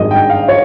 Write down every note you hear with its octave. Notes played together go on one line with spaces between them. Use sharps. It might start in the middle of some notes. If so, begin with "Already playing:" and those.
Already playing: G#1 G2 D#3 G#3 D#5
G5
F5
C#5